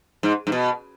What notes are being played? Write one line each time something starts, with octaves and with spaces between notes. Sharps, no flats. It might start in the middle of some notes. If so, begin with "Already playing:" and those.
G#2
G#2
B2